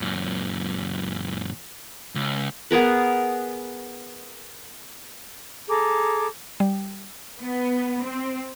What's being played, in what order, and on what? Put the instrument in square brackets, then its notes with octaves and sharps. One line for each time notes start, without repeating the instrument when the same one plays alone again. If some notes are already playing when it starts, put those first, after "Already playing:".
[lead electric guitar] F#2 A#2
C#2
[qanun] B3 G#4 A#4 B4
[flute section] G#4 A4 A#5 D6
[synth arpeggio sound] G3
[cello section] B3
C4